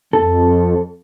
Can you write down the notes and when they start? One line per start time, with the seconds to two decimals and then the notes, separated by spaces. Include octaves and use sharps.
0.13 F2 A4